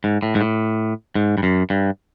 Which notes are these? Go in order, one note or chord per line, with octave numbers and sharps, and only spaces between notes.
G#2
A2
G#2
A2
G#2
G2
F#2
G2